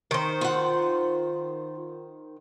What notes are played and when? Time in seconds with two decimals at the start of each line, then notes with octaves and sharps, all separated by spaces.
0.11 D#3 C5
0.41 F4 F#5